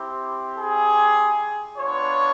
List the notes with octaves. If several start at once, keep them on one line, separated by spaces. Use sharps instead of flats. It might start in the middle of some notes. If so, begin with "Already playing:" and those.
Already playing: C4 E4 G4
G#4
B3 D4 F4 C#5